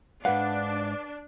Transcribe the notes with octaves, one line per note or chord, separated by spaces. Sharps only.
G#2 D4 B4 F5 F#5